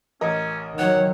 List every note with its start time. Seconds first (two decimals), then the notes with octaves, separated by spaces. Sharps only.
0.21 A1 C#4 A#4 D#5
0.79 D#3 F#3 C#5 F#5